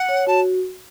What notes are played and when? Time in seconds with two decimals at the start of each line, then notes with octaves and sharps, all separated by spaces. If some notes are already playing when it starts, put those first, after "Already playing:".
Already playing: F#5
0.09 C#5
0.27 F#4 A5